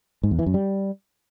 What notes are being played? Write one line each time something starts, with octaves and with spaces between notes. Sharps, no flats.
G#2
E2
E3
F#2
G3